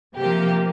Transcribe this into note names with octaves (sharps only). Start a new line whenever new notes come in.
C3 F3 A#3 G4